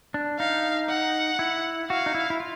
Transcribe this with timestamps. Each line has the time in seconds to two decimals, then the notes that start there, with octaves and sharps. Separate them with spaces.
0.14 D4
0.39 D#4 F5
0.89 F#5
1.39 E4
1.90 F#4 F5
2.06 D#4
2.15 E4
2.30 E4
2.40 F4